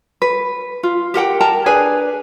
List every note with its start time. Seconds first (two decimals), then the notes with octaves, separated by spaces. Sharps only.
0.22 B4
0.83 F4
1.14 G4 A#4 F#5 G5
1.40 A#4 G5 A5 A#5
1.66 D4 G#4 B4 G#5